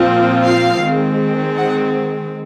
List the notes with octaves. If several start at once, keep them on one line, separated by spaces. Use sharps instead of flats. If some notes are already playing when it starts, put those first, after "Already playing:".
Already playing: A#2 F3 C4 F4
F5
D#3 G#3 C4
F#5